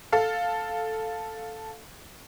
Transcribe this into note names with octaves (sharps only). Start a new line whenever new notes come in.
A4 F5